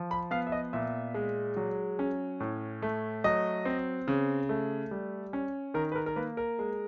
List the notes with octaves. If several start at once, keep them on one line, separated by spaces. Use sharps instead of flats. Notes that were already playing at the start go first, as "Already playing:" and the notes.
Already playing: F3
B5
B3 F5
E5
D#5
A#2 E5
G#3
F#3
C#4
A2
A3
F#3 D#5
C4
C#3
A3
G3
C#4
D#3 A#4
B4
A#4
A#4
A#3 B4
A#4
G#3